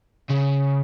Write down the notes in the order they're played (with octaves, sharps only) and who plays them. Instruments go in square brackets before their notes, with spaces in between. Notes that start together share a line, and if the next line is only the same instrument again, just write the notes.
[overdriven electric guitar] C#3